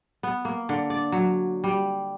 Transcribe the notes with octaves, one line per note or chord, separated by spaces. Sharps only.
B3
A#3
D3
D5
F#3
G3